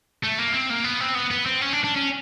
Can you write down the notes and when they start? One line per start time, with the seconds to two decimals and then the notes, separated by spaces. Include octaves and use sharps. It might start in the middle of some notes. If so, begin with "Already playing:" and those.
0.23 A3
0.38 A#3
0.54 C4
0.70 A#3
0.84 B3
1.00 C4
1.15 B3
1.31 B3
1.46 C4
1.61 C#4
1.73 D4
1.84 D4
1.96 C#4